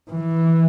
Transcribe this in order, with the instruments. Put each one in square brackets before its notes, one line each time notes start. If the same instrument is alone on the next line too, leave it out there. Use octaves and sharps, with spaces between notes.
[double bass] E3